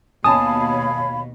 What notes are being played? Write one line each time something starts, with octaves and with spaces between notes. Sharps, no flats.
D#2 B2 C#5 F5 G#5 A5 B5 D#6